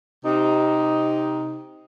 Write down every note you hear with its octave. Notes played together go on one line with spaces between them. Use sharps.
C3 D#4